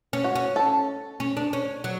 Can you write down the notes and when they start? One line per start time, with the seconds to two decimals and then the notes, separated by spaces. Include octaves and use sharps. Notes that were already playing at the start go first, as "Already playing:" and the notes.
0.13 C#4
0.24 F#4
0.35 C#4
0.56 A4
1.20 C#4
1.37 D4
1.53 C#4
1.84 F#3